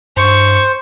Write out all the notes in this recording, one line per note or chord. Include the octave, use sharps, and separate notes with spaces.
G2 C5 C#6